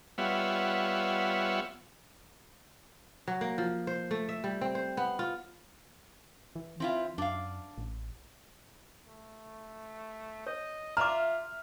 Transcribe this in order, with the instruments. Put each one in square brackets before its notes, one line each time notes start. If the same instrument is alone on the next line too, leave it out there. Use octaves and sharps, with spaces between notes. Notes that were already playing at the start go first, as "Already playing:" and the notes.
[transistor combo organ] G3 B3 F4 C#5 E5 F#5
[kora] F#3
A#3
F3
C5
A3
E5
G3
C4
C5
B3
F4
[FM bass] E3
[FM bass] E3 [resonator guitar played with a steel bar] C4 E4 F4
[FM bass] F#2 [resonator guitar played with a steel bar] D4 F5
[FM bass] A1
[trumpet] A3
[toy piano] C#5 [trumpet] D#5
[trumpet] F4 [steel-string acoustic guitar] E5 [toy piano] A#5 D6 [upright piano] F6